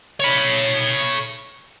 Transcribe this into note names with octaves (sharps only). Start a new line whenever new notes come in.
C#5 B5